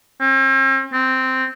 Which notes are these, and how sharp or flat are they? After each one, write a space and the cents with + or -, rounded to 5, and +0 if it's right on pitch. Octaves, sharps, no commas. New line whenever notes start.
C4 +45
C4 -5